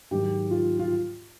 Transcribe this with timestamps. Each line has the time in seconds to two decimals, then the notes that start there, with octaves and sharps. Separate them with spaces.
0.11 G#2 D#3 F#3 G4
0.51 F4
0.79 F4